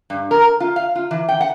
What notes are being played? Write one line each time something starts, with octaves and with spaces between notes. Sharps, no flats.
G2
A#4
F4
F5
F4
E3
G5
F#5